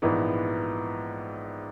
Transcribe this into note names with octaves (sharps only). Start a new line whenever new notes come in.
A#1 G#2 E3 B3